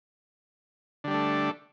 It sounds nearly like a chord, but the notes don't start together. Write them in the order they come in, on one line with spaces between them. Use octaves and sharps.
D3 G3 D4 A3